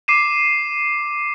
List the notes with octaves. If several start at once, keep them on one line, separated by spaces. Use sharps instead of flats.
D6 C7 D#7 E7